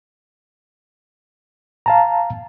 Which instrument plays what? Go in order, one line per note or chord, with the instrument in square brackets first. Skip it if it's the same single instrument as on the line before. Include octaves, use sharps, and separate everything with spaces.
[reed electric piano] F5 A5 A#5